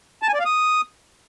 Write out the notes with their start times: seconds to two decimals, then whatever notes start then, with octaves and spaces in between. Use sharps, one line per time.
0.22 A5
0.28 G#5
0.34 D5
0.40 F5
0.45 D#6